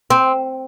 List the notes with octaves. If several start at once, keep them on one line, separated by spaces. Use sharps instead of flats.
C4